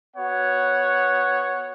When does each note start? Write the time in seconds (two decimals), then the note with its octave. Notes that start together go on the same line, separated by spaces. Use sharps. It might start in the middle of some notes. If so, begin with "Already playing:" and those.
0.15 B3 F#4 C#5 F#5